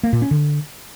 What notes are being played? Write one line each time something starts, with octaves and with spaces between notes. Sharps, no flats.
A#3
A#2
C#4
D3